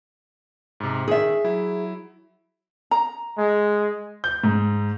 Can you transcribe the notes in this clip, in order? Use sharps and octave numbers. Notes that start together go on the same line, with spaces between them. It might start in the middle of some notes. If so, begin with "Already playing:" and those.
G#2 C3
D#3 G#4 E5
F#3 E4
A#5
G#3
G6
G#2